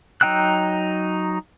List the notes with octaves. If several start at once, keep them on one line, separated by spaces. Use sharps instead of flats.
F#3 D#4 G5 E6 F#6